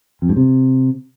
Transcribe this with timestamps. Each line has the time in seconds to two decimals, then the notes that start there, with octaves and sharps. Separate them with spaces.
0.22 F2
0.29 G2
0.36 C3